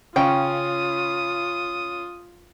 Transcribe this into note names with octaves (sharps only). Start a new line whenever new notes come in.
C#3 C#4 F4 G5 D#6